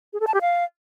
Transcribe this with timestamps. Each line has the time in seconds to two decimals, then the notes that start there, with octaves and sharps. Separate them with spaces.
0.13 G#4
0.20 A4
0.27 A5
0.34 G4
0.41 F5